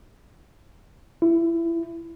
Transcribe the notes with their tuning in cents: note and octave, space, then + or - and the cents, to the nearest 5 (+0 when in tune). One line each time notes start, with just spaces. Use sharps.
E4 +20